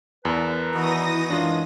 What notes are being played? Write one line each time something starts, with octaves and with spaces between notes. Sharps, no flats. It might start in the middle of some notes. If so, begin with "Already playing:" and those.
E2 A#4 B4 A5
E3 B3 D#4 F#4 D#6 A#6
F#2 G#3 D4 F4